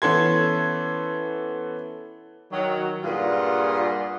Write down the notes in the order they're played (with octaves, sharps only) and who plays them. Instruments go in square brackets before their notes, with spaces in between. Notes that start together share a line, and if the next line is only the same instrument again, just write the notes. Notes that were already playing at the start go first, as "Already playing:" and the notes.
[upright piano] E3 B3 C#4 A4 C6 G#6
[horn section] D#3 F#3
G2 A#2 G3 F4 G#4 F#5